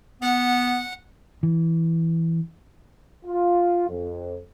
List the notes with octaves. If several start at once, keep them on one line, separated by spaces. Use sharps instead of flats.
B3 F#5
E3
F4
F2